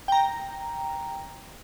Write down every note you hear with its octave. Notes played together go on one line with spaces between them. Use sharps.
G5 A#5